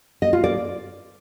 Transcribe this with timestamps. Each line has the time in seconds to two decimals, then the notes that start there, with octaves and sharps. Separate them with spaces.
0.22 D#5
0.33 F4
0.44 D5